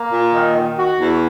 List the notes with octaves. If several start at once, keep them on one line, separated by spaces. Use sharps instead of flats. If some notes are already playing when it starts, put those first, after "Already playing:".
Already playing: A#3
A#2
D#3
D#3
F#4
E2